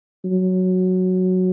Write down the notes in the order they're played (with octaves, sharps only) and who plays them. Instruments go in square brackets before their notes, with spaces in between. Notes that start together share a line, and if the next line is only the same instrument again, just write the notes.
[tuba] F#3